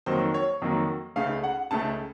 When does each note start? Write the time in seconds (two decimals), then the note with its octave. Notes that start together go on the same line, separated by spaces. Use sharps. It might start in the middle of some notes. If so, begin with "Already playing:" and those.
0.06 F2 D#3 F#3 A#3 C5
0.34 C#5
0.62 F2 D#3 F#3 A#3
1.16 C#2 C#3 A3 F5
1.43 F#5
1.71 C#2 C#3 A3 A5